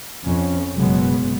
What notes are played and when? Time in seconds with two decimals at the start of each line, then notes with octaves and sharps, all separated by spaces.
0.24 F2 C#4
0.76 F#1 F#2 B2 F#3 G#3 B3